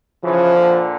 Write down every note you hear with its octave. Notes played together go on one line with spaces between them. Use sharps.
C#3 E3 F3
A#2 D3